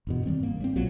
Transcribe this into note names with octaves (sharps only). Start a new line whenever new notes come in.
G1 E2 B2
D#3 E3 G3 C4
G#2 A#3
G3 A#3 C4
B1 A#2 F3 F#3